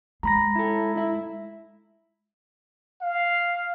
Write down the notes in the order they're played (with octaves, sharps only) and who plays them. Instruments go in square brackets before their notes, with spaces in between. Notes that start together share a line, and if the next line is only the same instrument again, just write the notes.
[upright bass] G#3 [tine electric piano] A#5 B5 A#6
[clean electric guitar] E4 A4
E4 E5
[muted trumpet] F5